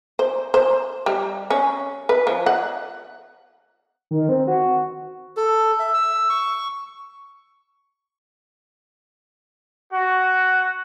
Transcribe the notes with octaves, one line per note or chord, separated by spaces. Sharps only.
C5
C5
G3
C#4
B4
F3
F#5
D#3
C4
F#4
A4
E5
E6
C#6
F#4